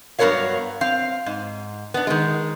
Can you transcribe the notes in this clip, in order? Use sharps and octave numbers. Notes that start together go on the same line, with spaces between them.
G2 F#3 B3 A#4 C#5 F5
C4 F5
G#2
B3 D4
D#3 G#3